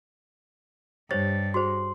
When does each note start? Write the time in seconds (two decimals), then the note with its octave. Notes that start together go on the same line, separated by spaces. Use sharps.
1.11 G2 G4 C5 C#5 A6
1.54 F#4 G#4 C5 C6